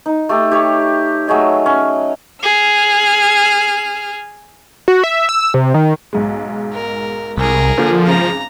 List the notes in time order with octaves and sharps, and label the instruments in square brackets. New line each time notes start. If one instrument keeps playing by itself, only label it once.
[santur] D#4
A3 G4 A4
G4 C#5
F#3 A3 G#4 D#5
C#4
[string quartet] G#4 F6
[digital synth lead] F#4
E5
E6
C3
D#3
[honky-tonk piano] B1 G#2 G#3
[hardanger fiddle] A#4
[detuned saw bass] C2 [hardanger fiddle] G#4 A#4
[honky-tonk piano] D3 A#3 F4 [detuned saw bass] F3
[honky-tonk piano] G#1 C#3 [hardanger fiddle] A#5